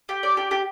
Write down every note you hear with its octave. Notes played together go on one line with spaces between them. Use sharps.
G4
D5
G4
G4